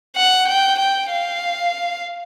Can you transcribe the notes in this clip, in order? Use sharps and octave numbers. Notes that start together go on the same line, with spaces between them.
F#5
G5
G5
F5